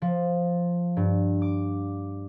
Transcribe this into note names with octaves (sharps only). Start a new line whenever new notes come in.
F3
G2
D6